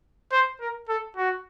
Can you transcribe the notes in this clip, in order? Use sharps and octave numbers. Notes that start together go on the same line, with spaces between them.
C5
A#4
A4
F#4